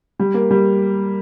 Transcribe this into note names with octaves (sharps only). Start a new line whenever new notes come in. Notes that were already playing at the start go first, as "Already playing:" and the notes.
G3
A#3
G3